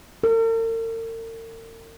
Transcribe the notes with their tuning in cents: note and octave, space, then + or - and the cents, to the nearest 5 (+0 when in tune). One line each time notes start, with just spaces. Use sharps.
A#4 -45